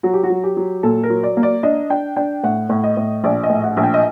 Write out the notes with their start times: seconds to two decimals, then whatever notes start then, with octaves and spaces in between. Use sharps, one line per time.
0.03 F#3 F#4
0.14 G4
0.24 F#4
0.30 F#3
0.44 G4
0.57 F#3
0.83 A#2 A4
1.03 A#4
1.10 F#3
1.23 D5
1.37 A#3
1.43 D5
1.63 D4 D#5
1.90 D4 G5
2.16 D4 G5
2.44 A2 F#5
2.69 A2
2.84 D#5
2.97 A2
3.24 A#1 D5
3.43 D#5
3.49 A2
3.64 F#5
3.77 A#1
3.84 G5
3.94 D#5